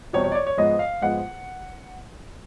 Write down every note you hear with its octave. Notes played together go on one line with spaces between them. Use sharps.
E2 B2 G3 C4 C#5
C#5
D5
C#5
C#5
G#2 F3 G#3 B3 D#5
F5
G#2 F3 G#3 B3 F#5